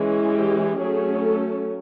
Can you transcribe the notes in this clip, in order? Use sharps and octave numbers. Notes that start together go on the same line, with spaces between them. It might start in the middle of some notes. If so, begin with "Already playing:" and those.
Already playing: E3 G#3 C#4
G4
F#3 A3 C#4 G#4
A4